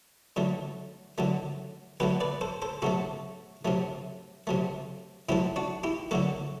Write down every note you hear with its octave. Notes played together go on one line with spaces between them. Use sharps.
D3 F#3 A3
D3 F#3 A3
D3 F#3 A3 G4 B4
B4 D5
A4 C5
A4 C5
C3 F#3 A3 F#4 A4
C3 F#3 A3
C3 F#3 A3
C3 F#3 A3 E4 G4
D4 F#4
E4 G4
D3 F#3 A3 F#4 A4